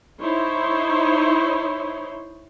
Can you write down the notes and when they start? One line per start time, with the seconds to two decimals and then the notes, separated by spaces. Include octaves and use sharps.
0.21 D#4 E4 C5 C#5